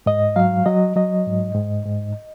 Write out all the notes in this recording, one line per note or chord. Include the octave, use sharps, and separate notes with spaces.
G#2 D#5
F#3 F5
F#3 D#5
F#3 D#5
G#2
G#2
G#2